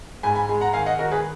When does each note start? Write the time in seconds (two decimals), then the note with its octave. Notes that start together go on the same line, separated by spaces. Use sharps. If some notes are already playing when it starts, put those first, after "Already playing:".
0.23 G#2 G#5 B5
0.35 G#5 B5
0.49 G#3
0.61 F#5 A#5
0.73 D#3 F5 G#5
0.86 D#5 F#5
0.99 D#3 F#4 A#4
1.11 G#4 B4